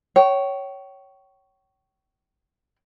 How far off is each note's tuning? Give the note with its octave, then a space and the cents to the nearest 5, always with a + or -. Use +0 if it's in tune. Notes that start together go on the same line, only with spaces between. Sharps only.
C#5 +0 G5 -35